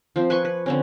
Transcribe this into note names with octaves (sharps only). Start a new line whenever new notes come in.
F3 C4
B4 G#5 C6 C#6
B4
D3 C4 C#4